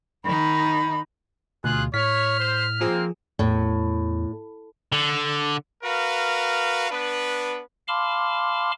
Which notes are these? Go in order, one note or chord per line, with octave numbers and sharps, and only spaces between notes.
D#3 D#4 B5
D2 B2 F4 G#4 F#6
A2 C#5 F6 B6
C5
F3 A#3 C4 G#4
E2 A2
D3
F#4 A#4 B4 F5
B3 D4 B4
F5 A5 B5 C6 D6 F6